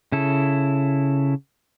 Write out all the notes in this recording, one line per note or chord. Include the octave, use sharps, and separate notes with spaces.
C#3 E4 A4